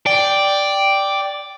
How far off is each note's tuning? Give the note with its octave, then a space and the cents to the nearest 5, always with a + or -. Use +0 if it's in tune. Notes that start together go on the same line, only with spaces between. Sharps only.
D5 +0 G5 +0